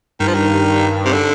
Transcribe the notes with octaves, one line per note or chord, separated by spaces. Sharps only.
G2 D#3
F3
D#3
C3
D3